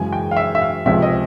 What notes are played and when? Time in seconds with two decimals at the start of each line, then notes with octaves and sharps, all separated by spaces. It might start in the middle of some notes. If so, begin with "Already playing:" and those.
Already playing: F#2 C#3 E3 G#3 G#5
0.13 G5
0.31 F5
0.37 E5
0.55 E5
0.61 F5
0.86 C#2 C3 F3 E5
1.02 D#5